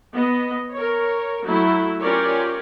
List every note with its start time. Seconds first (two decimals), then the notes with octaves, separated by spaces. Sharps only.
0.14 B3 D#5
0.73 A#4 C#5
1.45 F#3 A3 E4
2.00 C#4 F4 G4 A#4 C#5 D5